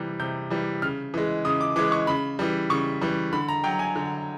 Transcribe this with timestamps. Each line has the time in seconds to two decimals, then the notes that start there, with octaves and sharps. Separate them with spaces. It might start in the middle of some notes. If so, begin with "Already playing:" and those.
Already playing: C3 E3 G3
0.20 C3 G6
0.50 E3 G3
0.82 C#3 F6
1.14 E3 G#3
1.45 C#3 D#6
1.61 D6
1.76 E3 G#3 D6
1.92 C#6
2.07 C#3 B5
2.39 E3 G3
2.70 C#3 C#6
3.01 E3 G3
3.33 D3 B5
3.49 A#5
3.64 F#3 G5
3.79 G#5
3.96 D3